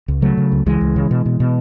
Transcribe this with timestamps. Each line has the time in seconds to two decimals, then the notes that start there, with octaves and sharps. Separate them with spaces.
0.08 C#2
0.22 C#3 F#3 A3
0.37 C#3
0.52 C#2
0.66 C#2 E3 G#3
0.81 C#2
0.96 C#3
1.11 B2
1.26 B2
1.40 B2